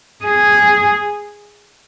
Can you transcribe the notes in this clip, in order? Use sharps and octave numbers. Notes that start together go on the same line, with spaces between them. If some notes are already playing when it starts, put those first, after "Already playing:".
G#4